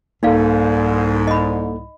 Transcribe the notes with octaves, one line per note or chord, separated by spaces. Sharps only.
C2 G#2 A#3 D#4 A4 D5 F5
D#5 B5